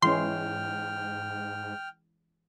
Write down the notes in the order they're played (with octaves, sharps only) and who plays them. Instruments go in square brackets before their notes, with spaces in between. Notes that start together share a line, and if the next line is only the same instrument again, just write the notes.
[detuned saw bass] G#2 [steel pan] E3 G#3 C#4 [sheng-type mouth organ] G5 F6 [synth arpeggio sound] C6